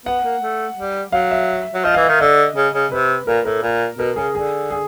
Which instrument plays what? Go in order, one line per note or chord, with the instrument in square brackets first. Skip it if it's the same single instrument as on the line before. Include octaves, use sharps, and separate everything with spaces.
[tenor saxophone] B3 [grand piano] F#5
[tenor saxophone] A#3
A3
G3
[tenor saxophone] F#3 [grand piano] F5
[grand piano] E5
[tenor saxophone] F#3
[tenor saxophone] F3 [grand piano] D#5
[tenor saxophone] E3 [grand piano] F5
[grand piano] E5
[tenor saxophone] D#3
[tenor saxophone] D3 [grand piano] D#5
[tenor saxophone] C#3
C#3
[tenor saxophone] C3 [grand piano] B4
[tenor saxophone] A#2 [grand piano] A#4
[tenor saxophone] A2 [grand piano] A#4
[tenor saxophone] A#2
[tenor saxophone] B2 [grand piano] A#4
[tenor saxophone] C#3 [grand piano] G#4
[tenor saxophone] D3 [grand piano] G#4
[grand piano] G#4